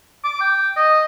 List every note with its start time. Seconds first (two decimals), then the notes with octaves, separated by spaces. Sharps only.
0.24 D6
0.41 G5
0.77 D#5